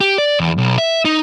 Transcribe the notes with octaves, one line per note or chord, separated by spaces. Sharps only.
G4
D5
E2
B1
E5
D#4